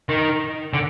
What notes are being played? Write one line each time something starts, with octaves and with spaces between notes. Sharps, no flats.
D#3
D3